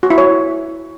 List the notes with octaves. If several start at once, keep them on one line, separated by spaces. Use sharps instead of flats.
F#4
E4
C#5